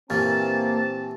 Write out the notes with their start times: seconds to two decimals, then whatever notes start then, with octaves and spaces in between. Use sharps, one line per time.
0.10 A#2 E3 A#3 C4 G4 A5 A6